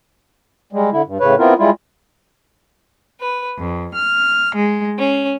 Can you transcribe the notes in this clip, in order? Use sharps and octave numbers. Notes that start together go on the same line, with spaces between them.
G3 G#3
D3 E4
G2
A2 C#3 B4 C#5
B3 C4 E4 F4 A#4
G3 G#3 E4 F4
B4
F2
F6
G#3
C#4